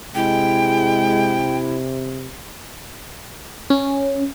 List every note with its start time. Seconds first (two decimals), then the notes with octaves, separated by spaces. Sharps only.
0.15 C3 G#3 E4 G5
3.70 C#4